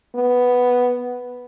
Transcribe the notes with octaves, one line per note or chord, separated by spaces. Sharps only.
B3